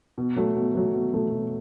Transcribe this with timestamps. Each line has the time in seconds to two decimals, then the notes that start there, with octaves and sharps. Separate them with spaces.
0.18 B2
0.36 F#3 A3
0.56 B2
0.75 F#3 A3
0.94 B2
1.13 F#3 A3
1.31 B2